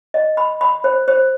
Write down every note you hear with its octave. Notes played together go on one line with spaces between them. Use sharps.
D#5
B5
B5
C5
C5